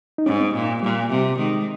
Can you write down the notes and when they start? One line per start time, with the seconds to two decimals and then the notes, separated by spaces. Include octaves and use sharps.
0.18 D#4
0.26 G#2 C#4
0.40 C4
0.54 A#2
0.82 A#2 G3
1.10 C3 G3
1.39 D#3 G#3